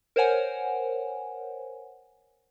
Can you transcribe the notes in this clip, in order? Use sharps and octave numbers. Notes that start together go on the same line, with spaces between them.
A#4 C5 C#5 F#5 G#5